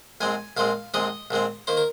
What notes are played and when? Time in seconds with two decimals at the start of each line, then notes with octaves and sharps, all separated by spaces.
0.21 A#1 A#2 G#3 C4 G#5
0.57 A#1 A#2 G#3 C4 F5
0.94 A#1 A#2 G#3 C4 D#5
1.31 A#1 A#2 G#3 C4
1.67 D#3 A#3 C5
1.77 A#4